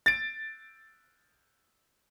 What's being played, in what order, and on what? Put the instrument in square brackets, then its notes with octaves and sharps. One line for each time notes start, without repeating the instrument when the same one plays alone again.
[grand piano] A6 D7